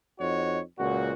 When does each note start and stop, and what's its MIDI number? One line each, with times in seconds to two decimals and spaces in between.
0.20 0.62 41
0.20 0.62 63
0.20 0.62 66
0.20 0.62 73
0.80 1.14 37
0.80 1.14 46
0.80 1.14 66